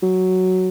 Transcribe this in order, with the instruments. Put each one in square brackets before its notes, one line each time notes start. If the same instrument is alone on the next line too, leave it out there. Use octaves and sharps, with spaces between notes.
[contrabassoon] F#3